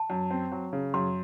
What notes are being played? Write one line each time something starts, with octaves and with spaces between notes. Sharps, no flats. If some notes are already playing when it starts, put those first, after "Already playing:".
Already playing: A5
F#2
C4
F#3
C#3
F#2 C6